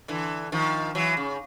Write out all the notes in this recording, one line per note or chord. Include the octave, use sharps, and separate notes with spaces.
D3 E3
D#3 F3
E3 F#3
C#3